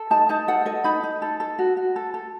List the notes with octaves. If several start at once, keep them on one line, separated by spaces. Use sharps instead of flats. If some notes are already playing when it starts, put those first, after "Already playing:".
Already playing: A4
D#4 A5
D#4 A5
A4 F#5
A4 D#5
D#4 B5
D#4
A4
A4
F#4
F#4
A4
A4